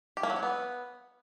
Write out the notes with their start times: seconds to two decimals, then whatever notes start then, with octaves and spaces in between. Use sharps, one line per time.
0.17 G4
0.23 A#3
0.30 F#3
0.36 C#4
0.43 B3